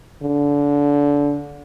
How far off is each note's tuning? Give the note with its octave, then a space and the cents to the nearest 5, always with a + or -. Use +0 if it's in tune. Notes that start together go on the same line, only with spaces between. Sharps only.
D3 -25